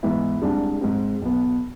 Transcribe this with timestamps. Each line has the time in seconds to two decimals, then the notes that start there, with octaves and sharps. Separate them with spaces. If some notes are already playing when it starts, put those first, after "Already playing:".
0.03 G#2 E3 B3 E4
0.42 C2 C3 G#3 D4 G#4
0.81 G#2 G#3 C4
1.22 B1 B2 B3